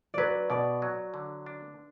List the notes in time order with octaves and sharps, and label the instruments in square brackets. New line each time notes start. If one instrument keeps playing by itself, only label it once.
[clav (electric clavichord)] F#3 [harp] B4 D5
[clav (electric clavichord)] B2 [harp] D5
[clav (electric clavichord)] F#3
D3
D4